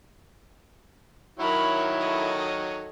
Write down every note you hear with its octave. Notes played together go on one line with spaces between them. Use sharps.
D#3 F#3 E4 A#4 C#5 B5
A4 D#5